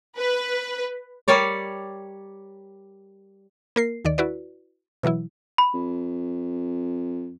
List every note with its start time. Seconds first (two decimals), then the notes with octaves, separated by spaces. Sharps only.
0.18 B4
1.28 G3 A#4 C#5 D5
3.76 A#3 A#4 C7
4.05 D#2 D#3 D5
4.18 E4 F#4 B4 D5
5.03 B2 E3 F#3 E4
5.58 B5
5.74 F2